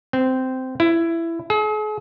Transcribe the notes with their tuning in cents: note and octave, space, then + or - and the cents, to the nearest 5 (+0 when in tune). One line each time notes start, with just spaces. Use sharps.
C4 -15
E4 +15
G#4 +45